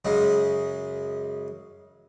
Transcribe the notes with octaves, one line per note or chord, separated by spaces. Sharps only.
F#2 C#3 G#3